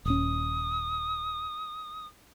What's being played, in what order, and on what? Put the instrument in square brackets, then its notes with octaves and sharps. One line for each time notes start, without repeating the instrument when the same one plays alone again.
[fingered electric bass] D#1 D#2 C#4 [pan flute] D#6